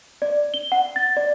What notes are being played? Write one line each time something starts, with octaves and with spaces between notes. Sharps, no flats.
D5
G7
F#5
A6
D5